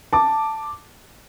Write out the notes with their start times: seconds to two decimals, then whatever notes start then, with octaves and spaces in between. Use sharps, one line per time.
0.13 A5 D6